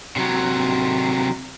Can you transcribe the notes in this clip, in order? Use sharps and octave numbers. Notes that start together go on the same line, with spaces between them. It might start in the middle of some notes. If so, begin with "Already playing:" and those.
C3 F#3